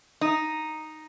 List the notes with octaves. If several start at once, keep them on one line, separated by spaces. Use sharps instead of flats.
D#4